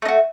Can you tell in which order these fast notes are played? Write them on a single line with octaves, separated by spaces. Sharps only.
A3 D#4 F#4